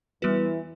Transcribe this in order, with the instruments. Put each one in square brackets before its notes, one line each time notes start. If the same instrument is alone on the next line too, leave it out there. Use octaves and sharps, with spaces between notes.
[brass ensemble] E2 E3 [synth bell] G3 B3 F#4 B4